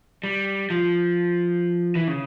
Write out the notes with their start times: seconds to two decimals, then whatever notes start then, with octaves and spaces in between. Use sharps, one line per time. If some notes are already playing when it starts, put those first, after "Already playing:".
0.23 G3
0.70 F3
1.95 E3
2.07 C#3